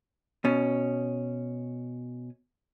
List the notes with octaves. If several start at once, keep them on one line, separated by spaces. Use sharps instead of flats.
B2 C#4